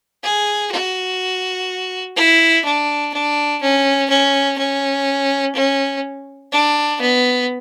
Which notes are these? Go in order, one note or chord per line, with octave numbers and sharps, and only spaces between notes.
G#4
F#4
E4
D4
D4
C#4
C#4
C#4
C#4
D4
B3